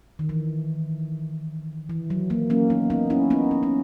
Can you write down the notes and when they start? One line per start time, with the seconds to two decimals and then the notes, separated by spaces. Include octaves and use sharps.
0.19 D#3
0.29 E3
1.90 E3
2.10 F#3
2.30 F#3 A#3
2.50 A#3 C#4
2.70 B3 D#4
2.90 B3 D#4
3.10 C#4 E4
3.30 B3 D#4
3.51 B3
3.63 C#4